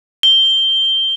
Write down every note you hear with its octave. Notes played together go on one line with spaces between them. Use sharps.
G7